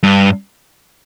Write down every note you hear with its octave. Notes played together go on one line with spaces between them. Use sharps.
G2